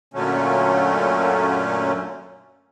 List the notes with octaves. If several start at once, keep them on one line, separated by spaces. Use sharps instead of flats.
F#2 A#2 D3 F#3 A3 C#4